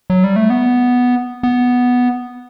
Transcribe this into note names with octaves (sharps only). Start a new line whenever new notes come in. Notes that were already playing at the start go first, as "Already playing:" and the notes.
F#3
G3
A3
B3
B3